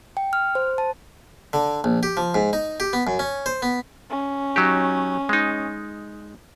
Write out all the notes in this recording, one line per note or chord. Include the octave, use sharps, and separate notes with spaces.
G5
F6
C5
A5
D3
A#1
G4
F3
G#2
D#4
G4
B3
F#2
C#4
C5
B3
C#4
F#3 D#4 G4
G#3 D#4